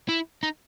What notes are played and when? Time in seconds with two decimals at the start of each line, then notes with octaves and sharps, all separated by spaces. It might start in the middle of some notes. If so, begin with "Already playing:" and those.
0.09 E4
0.43 D#4